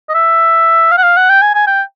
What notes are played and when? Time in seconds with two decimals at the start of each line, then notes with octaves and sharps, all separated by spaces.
0.09 D#5
0.15 E5
0.91 F5
0.98 F#5
1.03 F5
1.17 F#5
1.30 G5
1.42 G#5
1.55 G#5
1.67 G5